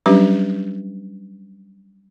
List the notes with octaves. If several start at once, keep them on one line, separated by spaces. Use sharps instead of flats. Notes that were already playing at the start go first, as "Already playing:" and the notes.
F#3 G3 C#4 D4 G4 B4